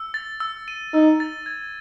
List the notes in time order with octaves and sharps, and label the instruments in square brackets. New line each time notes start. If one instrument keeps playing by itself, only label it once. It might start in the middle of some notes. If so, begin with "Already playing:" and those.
Already playing: [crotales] E6
A6
E6
D#7
[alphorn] D#4 [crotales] E6
[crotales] A6
G#6